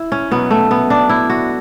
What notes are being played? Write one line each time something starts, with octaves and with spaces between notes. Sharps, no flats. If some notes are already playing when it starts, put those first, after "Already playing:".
Already playing: E4
C#4
B2 F#3 B3
A3
B3
D4
E4
F#4